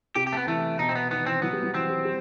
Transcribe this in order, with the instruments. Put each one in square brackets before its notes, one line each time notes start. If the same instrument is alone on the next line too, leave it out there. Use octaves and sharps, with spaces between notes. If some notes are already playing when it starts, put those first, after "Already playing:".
[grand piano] C3 [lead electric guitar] G4
[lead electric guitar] G4
A3
B3
[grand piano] E3 [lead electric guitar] A3
[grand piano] B2 [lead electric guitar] D#4
[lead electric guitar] C4
B3
[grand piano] D#3 [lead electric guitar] B3
[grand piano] E3 [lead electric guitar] C4
[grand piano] F#3 [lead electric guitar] B3
[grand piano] G3
F#3
[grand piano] E3 [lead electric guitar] C4
[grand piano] G3
G3